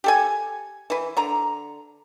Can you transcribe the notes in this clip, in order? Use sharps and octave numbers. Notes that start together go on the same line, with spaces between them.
G4 A4 G#5
E3 B4
D3 A#5